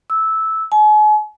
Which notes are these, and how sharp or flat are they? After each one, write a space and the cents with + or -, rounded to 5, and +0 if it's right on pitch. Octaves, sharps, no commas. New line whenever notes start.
E6 -10
G#5 +40